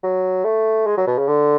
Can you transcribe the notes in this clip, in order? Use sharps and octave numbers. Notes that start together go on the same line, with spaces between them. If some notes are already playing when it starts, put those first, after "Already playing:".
F#3
A3
G#3
F#3
B2
C#3
D3